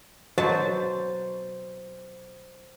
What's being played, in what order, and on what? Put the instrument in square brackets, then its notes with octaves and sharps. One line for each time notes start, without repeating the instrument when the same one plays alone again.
[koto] B2 F#3 A5 [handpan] C5